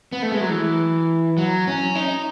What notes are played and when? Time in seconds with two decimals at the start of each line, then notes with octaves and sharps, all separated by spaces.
0.13 B3
0.22 A3
0.32 G#3
0.41 F#3
0.50 E3
1.38 F#3
1.67 C#4
1.95 D#4